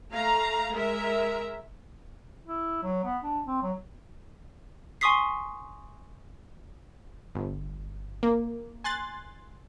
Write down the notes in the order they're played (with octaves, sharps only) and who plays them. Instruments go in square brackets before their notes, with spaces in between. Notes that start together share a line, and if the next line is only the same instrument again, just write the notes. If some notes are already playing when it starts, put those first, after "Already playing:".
[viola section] A3 F5 A#5
G#3 A#4 E5
[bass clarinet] E4
F#3
B3
D4
C4
F#3
[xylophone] G#5 C6 C#6 D#6 B6 C7
[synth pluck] G1
A#3
G#5 C6 F#6 A6